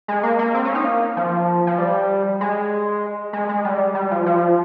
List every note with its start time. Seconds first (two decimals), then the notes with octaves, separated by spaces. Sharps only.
0.08 G#3
0.23 A#3
0.39 A#3
0.54 C4
0.65 C#4
0.75 D#4
0.85 A#3
1.17 F3
1.67 F3
1.79 G3
2.41 G#3
3.33 G#3
3.49 G#3
3.65 G3
3.95 G3
4.11 F3
4.26 F3